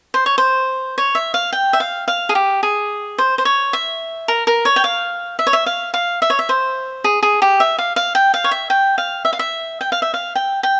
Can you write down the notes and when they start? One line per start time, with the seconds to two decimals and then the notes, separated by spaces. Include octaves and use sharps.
0.14 C5
0.26 C#5
0.38 C5
0.98 C#5
1.15 E5
1.34 F5
1.53 G5
1.73 E5
1.80 F5
2.08 F5
2.29 G#4
2.35 G4
2.63 G#4
3.18 C5
3.38 C5
3.45 C#5
3.73 E5
4.28 A#4
4.47 A#4
4.65 C#5
4.76 G5
4.84 F5
5.39 E5
5.47 C#5
5.53 E5
5.66 F5
5.94 F5
6.22 E5
6.30 C#5
6.39 E5
6.49 C5
7.04 G#4
7.23 G#4
7.42 G4
7.60 E5
7.78 F5
7.96 F5
8.15 G5
8.34 F5
8.44 C#5
8.51 E5
8.70 G5
8.98 F5
9.25 E5
9.33 F5
9.39 E5
9.81 G5
9.92 F5
10.02 E5
10.14 F5
10.35 G5
10.63 G5